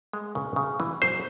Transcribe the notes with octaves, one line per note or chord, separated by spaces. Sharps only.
G#3
C#3
C#3
E3
F#3 C5